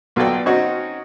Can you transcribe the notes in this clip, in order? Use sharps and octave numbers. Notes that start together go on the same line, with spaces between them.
B1 F4 F#4 A4 D5 G5
C4 C#4 D#4 F#4